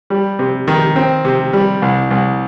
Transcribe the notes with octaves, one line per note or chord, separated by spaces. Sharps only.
G3
C3
D#3
C4
C3
G3
C2
C2